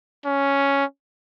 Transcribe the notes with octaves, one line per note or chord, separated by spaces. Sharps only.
C#4